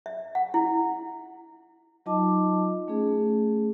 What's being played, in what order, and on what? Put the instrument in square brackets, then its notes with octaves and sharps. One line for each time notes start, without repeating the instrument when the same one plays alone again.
[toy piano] E5
F#5
E4
[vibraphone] F#3 D#4 F4 D#5 A5 D6
A3 C#4 G#4